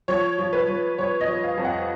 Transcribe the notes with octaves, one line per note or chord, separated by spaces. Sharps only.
F3 C#5
F3
B4
F3
F3 C#5
D#5
F3
F5
F2
F#5